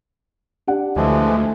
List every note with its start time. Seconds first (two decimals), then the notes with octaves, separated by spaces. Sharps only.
0.67 D4 G4 F#5
0.96 D2 E3 F3 G#3 A3